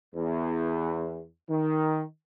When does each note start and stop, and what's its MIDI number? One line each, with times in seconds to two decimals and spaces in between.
0.15 1.25 40
1.49 2.02 51